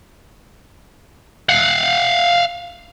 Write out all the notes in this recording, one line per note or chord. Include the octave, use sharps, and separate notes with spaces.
F5 F#5